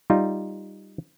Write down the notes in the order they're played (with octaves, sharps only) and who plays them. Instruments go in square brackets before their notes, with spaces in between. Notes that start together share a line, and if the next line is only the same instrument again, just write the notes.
[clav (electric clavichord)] G3 D#4 F4